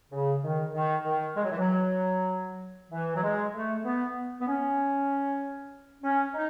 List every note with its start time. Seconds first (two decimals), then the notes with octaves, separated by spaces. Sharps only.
0.11 C#3
0.43 D#3
0.74 D#3
1.05 D#3
1.36 G#3
1.44 F#3
1.52 E3
1.58 F#3
2.91 E3
3.15 F#3
3.23 G#3
3.54 A3
3.85 B3
4.40 B3
4.48 C#4
6.03 C#4
6.34 D#4